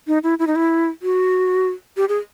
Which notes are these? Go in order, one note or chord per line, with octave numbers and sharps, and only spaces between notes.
D#4
E4
E4
D#4
E4
F#4
G4
G#4